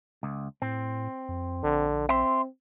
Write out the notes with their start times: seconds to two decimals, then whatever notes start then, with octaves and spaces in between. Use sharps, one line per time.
0.23 C#2
0.62 A2 C4
1.29 F2
1.64 A#1 D3
2.09 C4 E5 C6